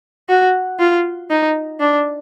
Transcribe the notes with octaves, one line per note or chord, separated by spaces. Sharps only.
F#4
F4
D#4
D4